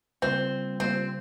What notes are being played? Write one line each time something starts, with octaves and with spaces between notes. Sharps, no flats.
C#3 G3 A#3 C4 F4 C5
C#3 G3 A#3 C4 F4 C5